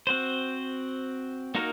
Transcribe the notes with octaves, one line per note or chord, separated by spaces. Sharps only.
C4 F#4 C5
A#3 D#4 F#4 A#4